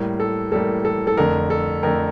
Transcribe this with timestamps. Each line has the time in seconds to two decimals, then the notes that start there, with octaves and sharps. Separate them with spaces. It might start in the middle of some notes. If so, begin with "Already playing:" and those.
Already playing: A2 G3 A#3
0.20 A4
0.52 A2 G3 A#3 A4
0.85 A4
1.07 A4
1.17 F2 D3 A3 A#4
1.50 A4
1.83 F2 D3 A3 A#4